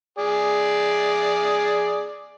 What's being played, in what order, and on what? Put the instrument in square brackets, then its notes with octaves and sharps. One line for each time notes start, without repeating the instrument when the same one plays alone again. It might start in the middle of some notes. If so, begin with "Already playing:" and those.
[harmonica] G#4 D5